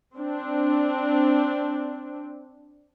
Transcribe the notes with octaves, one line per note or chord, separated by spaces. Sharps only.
C4 D4